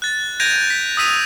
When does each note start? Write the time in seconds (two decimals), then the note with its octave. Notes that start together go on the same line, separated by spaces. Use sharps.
0.02 F#6 A6
0.40 G6 G#6 A#6 D7 D#7 F7
0.70 B6
0.97 D#6 E6 B6 D#7 F7